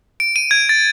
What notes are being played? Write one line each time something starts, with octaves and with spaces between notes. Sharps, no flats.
D7
D#7
G#6
A6